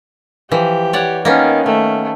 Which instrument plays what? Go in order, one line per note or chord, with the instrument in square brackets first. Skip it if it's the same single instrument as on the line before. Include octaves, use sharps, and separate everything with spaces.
[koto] E3 F3 [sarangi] G4
[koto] C#5 D5 F#5
[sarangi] D#3 [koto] A#3 B3 C#4
[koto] D#3 [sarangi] A3